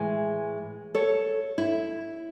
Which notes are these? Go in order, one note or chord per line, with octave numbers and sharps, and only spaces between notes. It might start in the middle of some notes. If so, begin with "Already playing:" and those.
Already playing: A2 E3 G#3 E5 G#5
A4 C#5
E4